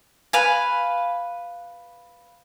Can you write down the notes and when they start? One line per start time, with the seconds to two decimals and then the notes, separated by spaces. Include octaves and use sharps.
0.33 B4 F5 G#5